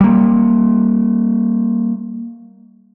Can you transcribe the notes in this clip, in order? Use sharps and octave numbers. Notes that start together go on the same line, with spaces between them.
G3 A#3